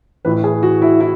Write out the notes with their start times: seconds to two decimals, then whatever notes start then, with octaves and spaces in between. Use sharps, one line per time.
0.25 A1 A2 E3 B4
0.44 G#4
0.63 F#4
0.82 E4
1.00 E4